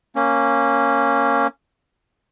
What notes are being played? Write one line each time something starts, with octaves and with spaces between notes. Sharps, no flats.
A#3 C#4